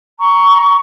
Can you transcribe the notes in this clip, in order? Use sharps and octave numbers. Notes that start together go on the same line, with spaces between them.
A#5 C#6